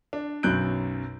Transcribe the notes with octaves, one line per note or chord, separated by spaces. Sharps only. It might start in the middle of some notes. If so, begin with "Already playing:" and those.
D4
B1 F#2 F#6 G6 D7